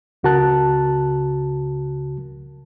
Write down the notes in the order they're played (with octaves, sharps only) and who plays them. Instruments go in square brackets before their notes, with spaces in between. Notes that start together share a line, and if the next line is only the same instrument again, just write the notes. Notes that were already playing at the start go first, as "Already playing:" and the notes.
[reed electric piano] C#2 C#3 F#4 A#4 A5 F#6